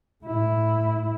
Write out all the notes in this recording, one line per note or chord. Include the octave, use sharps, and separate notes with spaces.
A2 E4